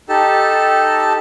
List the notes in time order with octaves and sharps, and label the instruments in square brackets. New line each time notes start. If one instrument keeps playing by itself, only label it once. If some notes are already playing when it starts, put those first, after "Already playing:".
[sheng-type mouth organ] D#4 G4 A4 A5